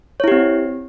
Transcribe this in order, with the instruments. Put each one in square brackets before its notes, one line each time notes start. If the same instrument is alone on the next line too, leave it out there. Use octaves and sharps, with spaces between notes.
[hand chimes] C#5
E4
G4
C4